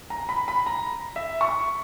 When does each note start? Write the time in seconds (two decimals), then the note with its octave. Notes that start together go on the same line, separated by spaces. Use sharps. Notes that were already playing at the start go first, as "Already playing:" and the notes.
0.10 A#5
0.29 B5
0.48 B5
0.66 A#5
1.16 E5
1.41 C#6